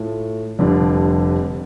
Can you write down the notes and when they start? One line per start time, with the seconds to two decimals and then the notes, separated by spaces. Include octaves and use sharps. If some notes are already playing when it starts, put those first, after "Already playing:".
Already playing: A2 A3 F4
0.59 F1 F2 D3 G3 D4